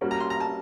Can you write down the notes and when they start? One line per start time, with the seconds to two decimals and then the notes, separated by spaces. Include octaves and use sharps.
0.01 G3 A#3 C#4 F#4
0.11 A#5
0.20 C6
0.30 A#5
0.40 A5